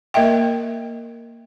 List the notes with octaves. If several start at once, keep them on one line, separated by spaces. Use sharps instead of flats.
A#3 A#4 D#5 E5 G5